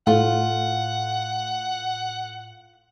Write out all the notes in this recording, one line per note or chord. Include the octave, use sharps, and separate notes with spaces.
A2 F4 F#5